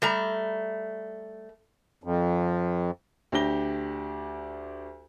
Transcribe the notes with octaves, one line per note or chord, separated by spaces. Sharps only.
G3 A3 A#5
F2
D2 D4 G4 A#6 G7